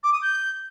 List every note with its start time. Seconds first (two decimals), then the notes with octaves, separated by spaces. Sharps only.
0.03 D6
0.12 D#6
0.22 G6